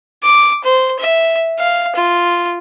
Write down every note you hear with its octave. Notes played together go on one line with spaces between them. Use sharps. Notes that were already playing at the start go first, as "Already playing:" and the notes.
D6
C5
E5
F5
F4